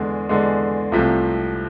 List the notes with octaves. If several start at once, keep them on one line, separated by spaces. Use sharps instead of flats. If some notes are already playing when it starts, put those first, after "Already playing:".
Already playing: E2 D3 G#3
E2 D3 G#3
C2 C3 F3 A3